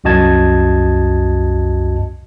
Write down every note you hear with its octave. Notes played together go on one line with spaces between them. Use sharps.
C2 F#2 F#4 D#5 A5 G#6